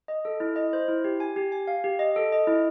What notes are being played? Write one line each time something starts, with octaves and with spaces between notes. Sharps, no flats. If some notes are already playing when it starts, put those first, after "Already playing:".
D#5
A4
E4
D#5
C5
E4
G4
G#5
G4
G#5
F5
G4
D#5
A4
D#5
E4